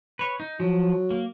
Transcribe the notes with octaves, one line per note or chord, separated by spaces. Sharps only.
B4 C#5
D#4
F3 F#3
A#3